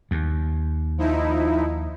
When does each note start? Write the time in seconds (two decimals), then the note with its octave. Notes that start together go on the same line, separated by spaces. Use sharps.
0.11 D#2
0.98 F3 D#4 E4